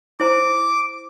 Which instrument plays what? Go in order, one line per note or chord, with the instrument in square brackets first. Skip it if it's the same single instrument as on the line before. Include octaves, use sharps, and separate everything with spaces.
[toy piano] E4 C5 A#5 [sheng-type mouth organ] D6